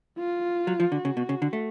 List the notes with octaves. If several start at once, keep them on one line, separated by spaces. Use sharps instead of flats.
F4
F#3
F3
D3 F#4
C#3
B2
C#3
D3
A3